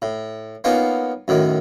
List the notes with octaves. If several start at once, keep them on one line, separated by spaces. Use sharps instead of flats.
A2
A#3 B3 C#4 D#4 F4
F#2 A2 D#3